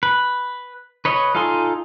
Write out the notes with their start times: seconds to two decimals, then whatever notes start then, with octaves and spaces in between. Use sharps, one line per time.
0.03 B4
1.05 B4 C#5 D#5
1.35 D#4 F4 A4 G#5 C6